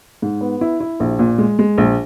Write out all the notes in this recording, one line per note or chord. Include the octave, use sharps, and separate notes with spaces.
G#2
B3
E4
E4
A#1
A#2
G#3
G#3
A#1